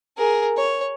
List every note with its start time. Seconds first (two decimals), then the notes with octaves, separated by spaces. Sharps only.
0.17 G#4 A#4
0.57 C#5